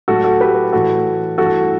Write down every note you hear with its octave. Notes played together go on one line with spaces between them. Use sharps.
A2 F#3 A3 F#4 A4
F#4 A4
G4 B4
A2 E3 A3 F#4 A4
G2 E3 A3 F#4 A4